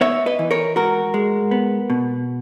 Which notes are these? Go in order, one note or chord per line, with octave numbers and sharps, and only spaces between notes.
B3 C#5 E5
B4 D#5
E3
A#4 C#5
G#2 F#4 A#4
G#3
B3
B2